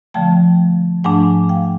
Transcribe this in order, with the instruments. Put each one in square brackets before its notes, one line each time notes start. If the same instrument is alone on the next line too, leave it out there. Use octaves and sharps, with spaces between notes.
[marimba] D3 F3 A3 G5 A5
G#2 F3 A3 D4 F#5 G#5
F5 G5